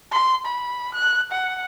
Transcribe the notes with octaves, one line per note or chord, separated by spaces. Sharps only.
C6
B5
F#6
F#5